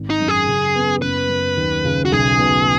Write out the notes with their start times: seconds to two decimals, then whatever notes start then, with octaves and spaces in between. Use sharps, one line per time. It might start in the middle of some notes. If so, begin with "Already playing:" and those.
Already playing: G#1
0.10 D#4
0.20 F#2
0.28 G#4
0.47 C#3
0.75 B3
1.02 F#1 B4
1.29 F#2
1.57 D#2
1.84 C#3
2.05 F#4
2.12 B1 G#4
2.39 B2